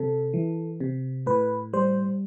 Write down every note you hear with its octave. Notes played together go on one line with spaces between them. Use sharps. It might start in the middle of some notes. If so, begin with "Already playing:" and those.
Already playing: C3 A4
E3
C3
A2 B4
G3 C5